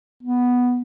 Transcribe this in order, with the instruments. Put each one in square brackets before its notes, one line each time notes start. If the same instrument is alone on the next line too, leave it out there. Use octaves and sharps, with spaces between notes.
[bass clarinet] B3